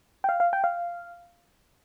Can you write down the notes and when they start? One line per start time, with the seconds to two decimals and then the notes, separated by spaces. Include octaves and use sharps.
0.24 G5
0.29 F5
0.40 F5
0.53 G5
0.64 F5